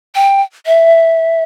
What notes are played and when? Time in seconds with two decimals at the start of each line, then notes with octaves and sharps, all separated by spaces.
0.15 G5
0.66 E5